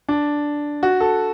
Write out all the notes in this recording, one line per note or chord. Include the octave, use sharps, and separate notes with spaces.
D4
F#4
A4